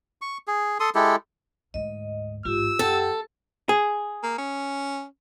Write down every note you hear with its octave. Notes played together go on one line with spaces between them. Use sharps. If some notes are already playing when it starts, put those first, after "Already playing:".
C#6
G#4
A4 C6 D#6
G#3 E4 G4 A4
D2 G#2 D#5
A1 G#2 F4 G4 E6
F#2 G4 A4 F#5 G5
G#4
A#3
C#4